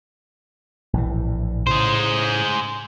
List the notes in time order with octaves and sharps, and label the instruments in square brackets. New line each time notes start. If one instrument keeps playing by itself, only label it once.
[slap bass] A#1 A2 E3
[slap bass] A2 C#3 [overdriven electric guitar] G#4 C5